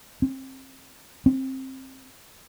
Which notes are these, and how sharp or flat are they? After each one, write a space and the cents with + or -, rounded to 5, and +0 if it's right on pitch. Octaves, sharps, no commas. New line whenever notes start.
C4 +25
C4 +20